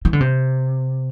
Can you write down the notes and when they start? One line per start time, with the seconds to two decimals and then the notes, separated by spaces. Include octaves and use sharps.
0.05 E3
0.13 D3
0.20 C3